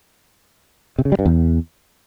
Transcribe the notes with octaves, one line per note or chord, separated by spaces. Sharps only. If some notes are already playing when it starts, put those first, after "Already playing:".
C3
C#3
G3
G2
E2